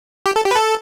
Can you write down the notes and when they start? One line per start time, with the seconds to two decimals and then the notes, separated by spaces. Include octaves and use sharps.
0.26 G4
0.36 A4
0.46 G4
0.51 B4
0.56 A4